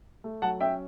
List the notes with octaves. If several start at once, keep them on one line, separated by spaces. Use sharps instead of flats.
A3
F#3 F#5 A5
C#4 E5 G5